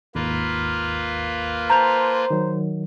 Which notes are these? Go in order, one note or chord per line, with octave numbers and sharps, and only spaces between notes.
G#1 D#2 A#3 F4 B4
C5 A5 A#5 G6 F7
D#3 F#3